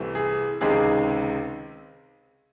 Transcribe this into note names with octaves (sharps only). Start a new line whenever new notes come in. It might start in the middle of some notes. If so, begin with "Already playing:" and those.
Already playing: C2 C3 E3 A3
G#4
C#2 C3 D#3 G#3 C4 G#4